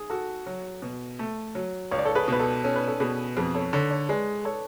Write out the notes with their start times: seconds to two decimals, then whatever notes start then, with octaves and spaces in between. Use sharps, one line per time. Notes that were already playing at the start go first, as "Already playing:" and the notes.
Already playing: G#4
0.10 F#4 A4
0.46 F#3
0.82 B2
1.19 A3
1.55 F#3
1.91 C#2 C#5
1.98 D5
2.05 A4 C#5
2.15 G#4 B4
2.28 B2 B4
2.40 A4
2.64 C#4 A4
2.76 B4
2.88 A4
3.00 B2 G#4 B4
3.37 F2 G#4 B4
3.55 A4 C#5
3.73 D3 A4 C#5
3.91 A4 C#5
4.09 G#3 B4 D5
4.45 A4 C#5